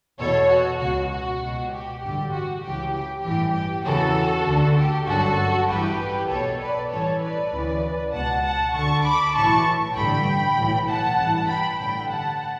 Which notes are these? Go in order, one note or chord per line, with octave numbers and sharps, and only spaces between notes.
E2 B2 A4 C#5
F#4
C#2 B2 F#4
F#4
C#2 B2
G4
A1 G2 D3 G4
F#4
C#2 C#3 E3 G4
G4
A1 G2 E3 G4
G4
E2 C#3 E3 F#4 A4
D2 D3
G4
G1 F#2 D3 F#4 A4
A1 G2 E3 G4 B4
B1 B2 A4 C#5
B4 D5
A1 G2 E3 A4 C#5
B4 D5
D2 C#3 E3
C#2 B2 F#5 A5
F#5 A5
D2 D3 A5 C#6
B5 D6
B1 A2 E3 A5 C#6
A1 G2 D3 G5 B5
B1 A2 E3
F#5 A5
A1 G2 E3
G5 B5
A1 G2 D3 G5 B5
F#5 A5